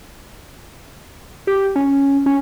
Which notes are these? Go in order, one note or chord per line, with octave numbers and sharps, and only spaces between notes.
G4
C#4
C#4